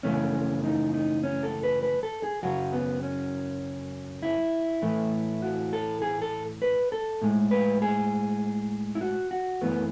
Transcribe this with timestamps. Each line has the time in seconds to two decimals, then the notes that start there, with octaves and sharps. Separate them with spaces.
0.03 F#2 C#3 E3 A3 C#4
0.64 D#4
0.94 D#4
1.23 C#4
1.43 A4
1.63 B4
1.83 B4
2.03 A4
2.23 G#4
2.43 F#2 C#3 F#3 F#4
2.72 B3
3.03 C#4
4.22 E4
4.82 A2 E3 A3
5.42 F#4
5.73 A4
6.02 G#4
6.22 A4
6.62 B4
6.92 A4
7.22 A2 G#3
7.51 B4
7.82 G#4
8.95 E4
9.01 F#4
9.31 F#4
9.61 F#2 E3 A3 B3